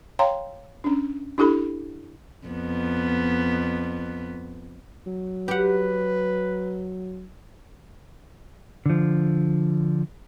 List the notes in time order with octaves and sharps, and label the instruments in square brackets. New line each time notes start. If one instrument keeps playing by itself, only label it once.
[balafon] C#5 F5 G5 A#5 C6
C#4 D4
D4 E4 G4 A4 B5
[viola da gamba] F2 B3
[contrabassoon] F#3
[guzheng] G4 F#5 [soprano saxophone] B4
[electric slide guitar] D3 F3